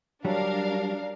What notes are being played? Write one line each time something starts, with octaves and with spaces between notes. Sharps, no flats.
F#3 G3 D4 A#4 F5